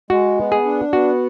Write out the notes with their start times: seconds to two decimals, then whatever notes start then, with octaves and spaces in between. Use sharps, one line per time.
0.10 G#3 F#4
0.38 B3
0.52 G#4
0.65 D4
0.93 B3 F#4